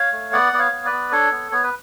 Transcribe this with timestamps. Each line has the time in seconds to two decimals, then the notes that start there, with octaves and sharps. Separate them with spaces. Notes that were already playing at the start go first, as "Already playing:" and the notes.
Already playing: C#5 F5
0.12 A3
0.32 B3 D5 F#5
0.53 B3 D5
0.59 C#5 F5
0.72 B3
0.85 B4 D5
0.92 B3
1.12 D4 A4 C#5
1.31 B3
1.51 B3 C#5
1.63 B4